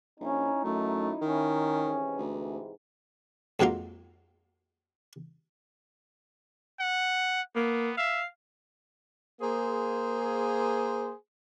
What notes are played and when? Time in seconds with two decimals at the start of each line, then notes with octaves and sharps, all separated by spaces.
0.20 A#1 C#4 D#4 E4
0.64 F#2 A3
1.21 D#3 C#4
1.84 G#2 C3 E3
2.17 D2
3.60 F2 G#2 F#3 A#3 F4
6.80 F#5
7.55 A#3 B3
7.97 E5 F5
9.41 A#3 G#4 C5